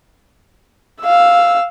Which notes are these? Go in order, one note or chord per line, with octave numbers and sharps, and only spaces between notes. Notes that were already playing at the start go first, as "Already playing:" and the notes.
F5 E6